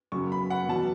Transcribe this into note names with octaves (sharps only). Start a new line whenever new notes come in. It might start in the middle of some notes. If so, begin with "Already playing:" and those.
F#2 C#3 F#3 C#6
B5
F#5
E2 B2 F#3 A5